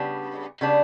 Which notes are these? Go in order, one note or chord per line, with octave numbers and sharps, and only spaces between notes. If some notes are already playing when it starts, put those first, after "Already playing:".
Already playing: C#3 G3 B3 D4
C#3 G3 B3 D4